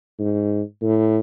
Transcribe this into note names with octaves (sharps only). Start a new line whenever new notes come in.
G#2
A2